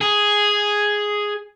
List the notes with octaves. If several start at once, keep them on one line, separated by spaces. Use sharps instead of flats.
G#4